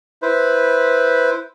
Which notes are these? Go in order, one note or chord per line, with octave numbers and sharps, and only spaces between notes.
E4 B4 C5